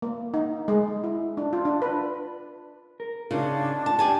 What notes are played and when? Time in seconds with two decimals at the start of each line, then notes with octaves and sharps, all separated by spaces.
0.02 A#3
0.34 D#4
0.68 G#3
1.04 E4
1.37 D4
1.53 F4
1.65 D4
1.82 B4
3.00 A#4
3.31 C#3 D4 D#4 F4
3.86 A5
3.99 G4 D5 G#5 A5